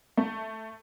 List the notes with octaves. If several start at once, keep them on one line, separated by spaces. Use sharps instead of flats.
A3